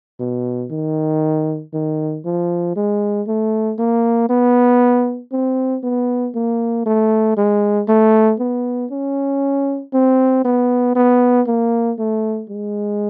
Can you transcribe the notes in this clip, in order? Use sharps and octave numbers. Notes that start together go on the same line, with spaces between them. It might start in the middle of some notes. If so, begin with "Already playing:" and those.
B2
D#3
D#3
F3
G#3
A3
A#3
B3
C4
B3
A#3
A3
G#3
A3
B3
C#4
C4
B3
B3
A#3
A3
G#3